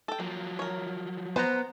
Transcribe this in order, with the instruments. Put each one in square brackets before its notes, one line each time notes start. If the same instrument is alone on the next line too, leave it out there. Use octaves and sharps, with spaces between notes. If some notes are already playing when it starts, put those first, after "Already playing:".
[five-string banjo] A4 G5
[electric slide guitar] F3 F#3 [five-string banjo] A#3
[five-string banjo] A#4 C#5
[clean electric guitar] B3 [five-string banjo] B4 [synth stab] C5 A#5